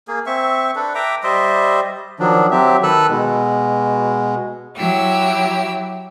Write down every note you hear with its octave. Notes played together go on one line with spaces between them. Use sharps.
A#3 G#4
C4 E5 C#6
D4 A4 B4
E5 G5 A#5 D6
G3 C5 D#5 E5
D#3 F3 F#3 D4
F#3 C4 G4 E5
D#3 A4 B4 E6 F#6
B2 G#3
F#3 E4 G4 E6